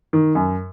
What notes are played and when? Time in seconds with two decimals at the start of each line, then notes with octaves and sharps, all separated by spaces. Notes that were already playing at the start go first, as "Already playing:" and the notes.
0.13 D#3
0.35 F#2